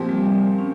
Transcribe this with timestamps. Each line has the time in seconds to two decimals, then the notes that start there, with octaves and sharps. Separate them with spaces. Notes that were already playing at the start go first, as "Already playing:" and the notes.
Already playing: A#2 F3 C4 G4
0.09 G3
0.58 C#4